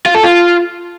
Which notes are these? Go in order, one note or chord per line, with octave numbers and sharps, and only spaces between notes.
F4
A4
F4